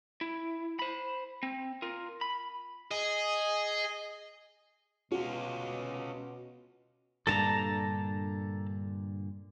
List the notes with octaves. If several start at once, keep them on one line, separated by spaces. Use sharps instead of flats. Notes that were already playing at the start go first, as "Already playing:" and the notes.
E4
C5 B5
C4
F4 A#4
B5
G#4 D#5
B2 C#4 F4 F#4
G2 A#2 D3 A4 A5 A#5